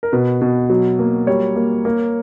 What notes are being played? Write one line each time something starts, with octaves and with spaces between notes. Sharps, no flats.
A#4
B2 B4
B2
F#3
A#3
G3 C#5
A#3
A#3